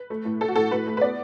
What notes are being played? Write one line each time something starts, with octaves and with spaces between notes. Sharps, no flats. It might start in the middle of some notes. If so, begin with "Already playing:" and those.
Already playing: B4
A3
A2
A3 A4
F#4
A2 A4
A2 B4
A3
B4
B3 D5